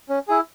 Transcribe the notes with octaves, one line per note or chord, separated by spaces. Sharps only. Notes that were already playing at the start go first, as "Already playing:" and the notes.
C#4
E4 G#4